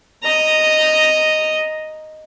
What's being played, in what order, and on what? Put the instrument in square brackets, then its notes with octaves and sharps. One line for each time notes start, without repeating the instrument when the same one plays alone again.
[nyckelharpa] D#5 A#5